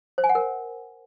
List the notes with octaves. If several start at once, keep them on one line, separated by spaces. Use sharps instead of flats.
C5
G#5
F#5
A#4